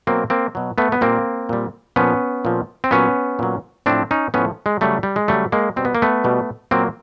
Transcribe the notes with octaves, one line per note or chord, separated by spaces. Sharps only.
B2 F#3 A#3 C4
A#3 C4
B2 F#3
A3 B3
B3
A#2 G3 A#3 C4
A#2 G3
A#2 F3 B3 C#4
A#2 F3
C4
A#2 F#3 B3 C#4
A#2 F#3
A2 F3 C4 D4
C#4 D#4
A2 F3 B3 C#4
G#3
C#3 F#3 G3 A3
G3
G#3
C#3 F#3 G3 A3
G#3 A#3
B2 G3 C4
B3
A#3
A3 B3
B2 G3
A#2 F#3 A#3 C4